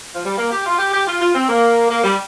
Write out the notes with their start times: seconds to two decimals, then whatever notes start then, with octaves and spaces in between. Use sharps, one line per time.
0.15 F3
0.25 G3
0.38 A#3
0.51 G4
0.66 F4
0.79 G4
0.94 G4
1.07 F4
1.21 F4
1.35 C4
1.48 A#3
1.90 A#3
2.04 G3